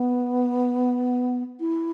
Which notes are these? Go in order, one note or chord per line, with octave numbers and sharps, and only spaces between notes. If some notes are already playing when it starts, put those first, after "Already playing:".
Already playing: B3
E4